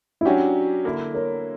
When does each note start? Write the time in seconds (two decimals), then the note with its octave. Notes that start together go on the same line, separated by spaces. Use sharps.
0.21 E4
0.25 F#3 C#4 D4 F#4 G4
0.85 D3 A#3 E4
1.14 A#4 C#5